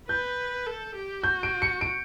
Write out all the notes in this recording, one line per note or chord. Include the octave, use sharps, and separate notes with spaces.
B4 G6
A4
G4
F#4 G6
D7
C#7
D7